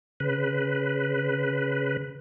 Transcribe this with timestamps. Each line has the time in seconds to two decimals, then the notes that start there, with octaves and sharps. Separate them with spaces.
0.20 C#3 B4